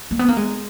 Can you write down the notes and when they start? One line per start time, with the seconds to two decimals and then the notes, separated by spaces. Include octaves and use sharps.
0.11 A#3
0.19 B3
0.29 A#3
0.37 G#3